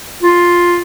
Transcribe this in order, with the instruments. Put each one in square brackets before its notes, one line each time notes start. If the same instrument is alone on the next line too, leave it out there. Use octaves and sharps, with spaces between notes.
[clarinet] F4